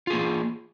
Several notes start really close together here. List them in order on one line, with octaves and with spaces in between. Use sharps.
F4 G#4 A#3